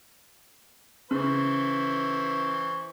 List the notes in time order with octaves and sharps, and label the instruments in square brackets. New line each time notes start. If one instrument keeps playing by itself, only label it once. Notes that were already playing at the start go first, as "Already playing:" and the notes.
[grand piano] C#3 [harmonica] E3 C5 C#6